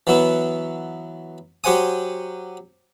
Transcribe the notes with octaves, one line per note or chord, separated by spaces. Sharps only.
E3 F#3 B3 E4
F#3 G4 C5 F#5 G#5 D#6